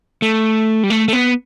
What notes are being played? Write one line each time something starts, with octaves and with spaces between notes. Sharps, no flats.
A3
G3
A3
A3
B3